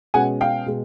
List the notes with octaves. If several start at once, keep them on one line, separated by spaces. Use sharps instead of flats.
B2 G#3 C#4 F#5 G#5
F5 G5
B2 G#3